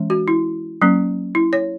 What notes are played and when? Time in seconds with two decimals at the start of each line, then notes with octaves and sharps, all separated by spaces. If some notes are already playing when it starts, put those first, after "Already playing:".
Already playing: E3 G#3 C#4
0.10 F#4
0.28 E4
0.82 F#3 A#3 C#4
1.35 E4
1.53 C#5